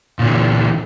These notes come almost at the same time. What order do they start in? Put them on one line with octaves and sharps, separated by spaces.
A#2 D3 E3